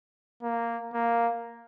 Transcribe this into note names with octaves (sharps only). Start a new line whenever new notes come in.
A#3
A#3